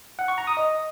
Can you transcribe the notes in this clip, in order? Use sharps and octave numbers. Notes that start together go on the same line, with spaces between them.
F#5
C#6
A#5
D#6
D#5